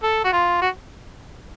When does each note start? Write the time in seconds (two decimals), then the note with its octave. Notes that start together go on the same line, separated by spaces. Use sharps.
0.03 A4
0.24 F#4
0.32 F4
0.61 F#4